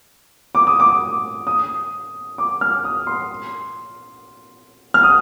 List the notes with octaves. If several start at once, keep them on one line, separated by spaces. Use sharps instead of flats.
D6
D#6
D6
D#6
D6
F6
D#6
C6
F6
D#6